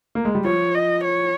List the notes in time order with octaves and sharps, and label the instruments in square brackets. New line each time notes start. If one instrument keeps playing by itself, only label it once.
[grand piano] A#3
G#3
G3
[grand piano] F3 [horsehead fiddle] C#5
[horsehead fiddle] D#5
C#5